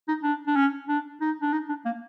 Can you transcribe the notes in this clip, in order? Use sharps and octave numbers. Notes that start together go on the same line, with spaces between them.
D#4
D4
D4
C#4
D4
D#4
D4
D#4
D4
A#3